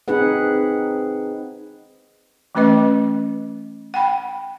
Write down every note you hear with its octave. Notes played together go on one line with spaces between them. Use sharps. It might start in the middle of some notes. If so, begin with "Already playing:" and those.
C4 D#4 G#4 B4 F#5
E3 A3 C#4 B4 D#5
F#5 G5 B5